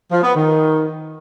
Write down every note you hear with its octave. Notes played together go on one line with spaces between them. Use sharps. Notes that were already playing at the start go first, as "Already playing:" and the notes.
F3
B3
D#3